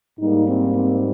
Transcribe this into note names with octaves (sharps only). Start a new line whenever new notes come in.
G#2 G3 A#3 D#4
C4
C4